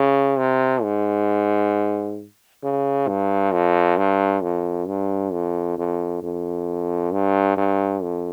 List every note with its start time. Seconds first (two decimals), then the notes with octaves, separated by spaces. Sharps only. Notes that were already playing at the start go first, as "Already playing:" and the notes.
Already playing: C#3
0.38 C3
0.83 G#2
2.63 C#3
3.08 G2
3.52 F2
3.98 G2
4.43 F2
4.88 G2
5.33 F2
5.78 F2
6.23 F2
7.12 G2
7.57 G2
8.02 F2